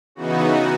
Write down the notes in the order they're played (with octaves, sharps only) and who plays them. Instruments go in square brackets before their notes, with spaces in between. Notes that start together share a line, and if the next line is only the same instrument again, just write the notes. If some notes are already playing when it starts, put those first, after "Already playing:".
[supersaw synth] C#3 E3 B3 D#4 F#4